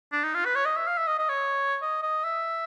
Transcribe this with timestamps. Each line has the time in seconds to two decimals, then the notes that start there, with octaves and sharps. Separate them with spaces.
0.13 D4
0.24 D#4
0.34 F4
0.45 B4
0.55 C#5
0.65 D#5
0.76 E5
0.87 F5
0.98 E5
1.07 D#5
1.19 D#5
1.29 C#5
1.82 D#5
2.03 D#5
2.24 E5